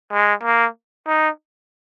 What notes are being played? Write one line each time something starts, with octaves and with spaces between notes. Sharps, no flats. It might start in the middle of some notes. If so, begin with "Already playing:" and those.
G#3
A#3
D#4